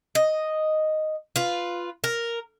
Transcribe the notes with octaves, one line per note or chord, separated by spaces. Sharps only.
D#5
F4 B4
A#4